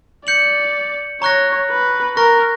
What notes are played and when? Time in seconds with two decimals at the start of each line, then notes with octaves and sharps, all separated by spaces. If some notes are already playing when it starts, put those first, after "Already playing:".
0.26 D5 G6 C#7 F#7
1.21 C#5 A#5 C#6 F#6 A#6
1.70 B4
2.16 A#4 A#5 C#6 F#6 A#6